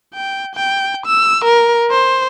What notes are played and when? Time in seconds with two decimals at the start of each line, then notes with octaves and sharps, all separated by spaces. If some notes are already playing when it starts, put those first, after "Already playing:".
0.14 G5
0.55 G5
1.06 E6
1.45 A#4
1.91 C5